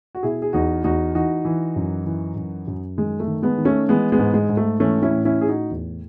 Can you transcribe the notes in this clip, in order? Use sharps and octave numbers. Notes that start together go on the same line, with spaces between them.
F#4
B2 E4 G#4
G#4
E2 D#4 F#4
E2 D#4 F#4
E3 D#4 F#4
E3
F#2
E3
F#2
F#2
D#3 G#3
A3
D#3
G#3 B3
D#3
A3 C#4
E3 G#3 B3
G#3 B3
G#2
G#3
G#2
A3
E3 A3 C#4
C#4 E4
A2
C#4 E4
A2 G#4
D#4 F#4
E2